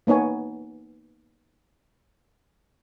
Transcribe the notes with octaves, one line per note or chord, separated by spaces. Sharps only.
A#3 B3 D#4 C#5 G#5